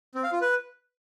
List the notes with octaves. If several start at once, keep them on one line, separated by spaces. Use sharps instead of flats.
C4
F5
F4
B4